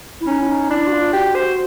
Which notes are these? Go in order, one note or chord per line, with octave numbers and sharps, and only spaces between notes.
E4
C#4 D#4
E4
D#4
D4 E4
F#4
F4
F#4 G4
C5